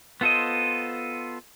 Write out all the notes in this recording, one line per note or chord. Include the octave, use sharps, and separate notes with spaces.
B3 F4 A4 C5 D#5